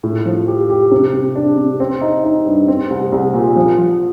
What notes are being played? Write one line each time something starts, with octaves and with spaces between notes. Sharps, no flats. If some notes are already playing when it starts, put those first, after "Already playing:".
A2
F3
G4
G4
C3
C3
D4
C3
C4
D#4
D#4
G2
C4
C2
C2
A#2
F3
F3